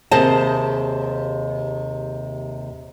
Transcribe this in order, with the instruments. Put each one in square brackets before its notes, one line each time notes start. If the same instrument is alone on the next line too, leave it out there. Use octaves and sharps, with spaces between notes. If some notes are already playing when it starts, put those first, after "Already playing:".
[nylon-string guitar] D#2 C3 G#4 C5 D#5 A5